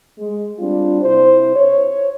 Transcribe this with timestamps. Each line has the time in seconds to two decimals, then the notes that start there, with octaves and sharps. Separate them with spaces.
0.19 G#3
0.59 G3 C4 D4 F4
1.02 C3 E4 C5
1.55 C#5